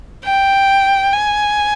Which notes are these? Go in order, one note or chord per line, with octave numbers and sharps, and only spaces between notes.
G5
G#5